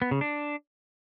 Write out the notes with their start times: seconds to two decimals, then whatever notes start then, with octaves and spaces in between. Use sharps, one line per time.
0.02 B3
0.11 C#3
0.21 D4